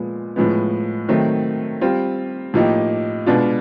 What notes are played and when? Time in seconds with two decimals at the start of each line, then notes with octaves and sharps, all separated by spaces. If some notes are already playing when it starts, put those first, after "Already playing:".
Already playing: A#2 F3 G#3 B3
0.36 A2 F3 G#3 B3
1.08 D#3 F#3 A3 C4
1.81 G3 C4 F4
2.54 A2 F3 A#3 D#4 G4
3.26 B2 G#3 B3 D4 F4